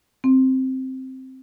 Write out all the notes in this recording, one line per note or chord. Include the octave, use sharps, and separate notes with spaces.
C4